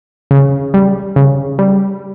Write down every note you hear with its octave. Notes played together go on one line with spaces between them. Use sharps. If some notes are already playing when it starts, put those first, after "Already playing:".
C#3
G3
C#3
G3